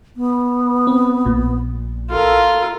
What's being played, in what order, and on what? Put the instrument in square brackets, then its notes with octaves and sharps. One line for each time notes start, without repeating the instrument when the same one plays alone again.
[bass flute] B3
[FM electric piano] C4
[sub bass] A#1 [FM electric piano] A#2
[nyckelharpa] F4 A#4 [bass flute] A4